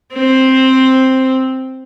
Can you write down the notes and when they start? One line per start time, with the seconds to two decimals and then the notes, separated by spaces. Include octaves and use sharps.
0.14 C4